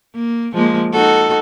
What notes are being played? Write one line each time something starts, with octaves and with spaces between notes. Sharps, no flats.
A#3
F3 G#3 A#3
D#4 F#4 A4